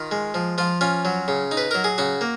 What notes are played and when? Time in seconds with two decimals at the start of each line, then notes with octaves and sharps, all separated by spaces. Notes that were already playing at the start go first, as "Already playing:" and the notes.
Already playing: D#3 F4
0.12 G#3
0.34 F3
0.58 F3 F4
0.81 C#4 F4
1.05 F#3
1.28 C#3
1.51 D#4
1.57 B4
1.71 F#3 A#4
1.84 G#4
1.98 C#3 F#4
2.21 A#3